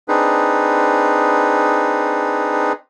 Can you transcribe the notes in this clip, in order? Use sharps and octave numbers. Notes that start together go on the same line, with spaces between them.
C4 D4 D#4 G#4 B4